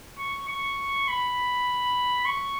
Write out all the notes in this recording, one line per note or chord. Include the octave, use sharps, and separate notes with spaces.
C#6
C#6
B5
C#6